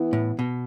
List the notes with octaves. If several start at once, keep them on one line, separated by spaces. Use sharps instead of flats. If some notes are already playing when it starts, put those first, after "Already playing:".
Already playing: E3 B3 E4
A2
B2